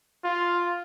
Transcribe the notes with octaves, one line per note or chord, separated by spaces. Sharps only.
F4